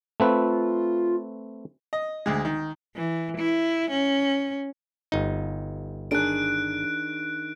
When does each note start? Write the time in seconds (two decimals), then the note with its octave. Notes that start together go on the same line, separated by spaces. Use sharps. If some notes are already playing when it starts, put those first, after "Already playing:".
0.20 A3 C4 F4 B4
1.93 D#5
2.26 D2 G#3
2.45 D#3
2.96 E3
3.38 E4
3.91 C#4
5.12 G1 D#4
6.11 D#3 D4 G#4 F#6 D7